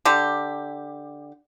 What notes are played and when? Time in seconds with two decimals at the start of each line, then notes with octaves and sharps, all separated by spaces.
0.05 D3 G4